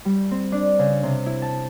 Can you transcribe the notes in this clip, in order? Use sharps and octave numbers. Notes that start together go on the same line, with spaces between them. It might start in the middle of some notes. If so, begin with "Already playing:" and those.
G3
C4
D4
C#3
C3
E4
A5